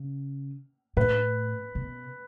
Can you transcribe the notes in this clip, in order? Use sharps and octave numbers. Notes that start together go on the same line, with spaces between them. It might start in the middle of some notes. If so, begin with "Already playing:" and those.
Already playing: C#3
A2 B4
B2